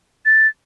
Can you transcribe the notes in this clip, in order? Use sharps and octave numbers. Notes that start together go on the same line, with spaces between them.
A6